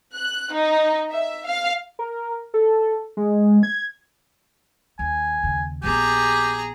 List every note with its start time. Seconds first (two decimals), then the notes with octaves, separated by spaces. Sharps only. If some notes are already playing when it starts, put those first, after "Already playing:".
0.13 F#6
0.52 D#4
1.12 E5
1.46 F5
1.99 A#4
2.54 A4
3.17 G#3
3.63 G#6
4.99 D#2 G#5
5.43 D#2 C#3
5.83 A#1 B3 G4 G#4 A#5